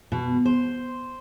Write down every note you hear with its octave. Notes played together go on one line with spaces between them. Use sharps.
B2
C5